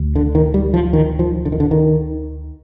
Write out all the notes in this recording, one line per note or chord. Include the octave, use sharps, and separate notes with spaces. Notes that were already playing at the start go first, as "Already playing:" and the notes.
Already playing: D2
D3
D#3
G3
F3
D#3
F3
D3
D#3
D3
D#3